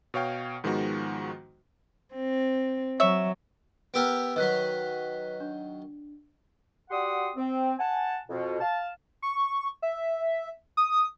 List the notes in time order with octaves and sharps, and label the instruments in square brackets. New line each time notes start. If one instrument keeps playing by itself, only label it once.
[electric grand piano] B2 C#5 F5 G5
G#2 D#3 F3 G#3 B3 F#4
[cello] C4
[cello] F#3 [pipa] C#5 E5
[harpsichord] B3 G4 A#4 [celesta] E6 D7
[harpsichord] D#3 F#3 [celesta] B4 F#6 B6
[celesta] D4
[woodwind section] F#4 G4 D5 F#5 C6 D#6
C4
F#5 G#5 A5
F2 B2
F5 A5
[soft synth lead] C#6
E5
D#6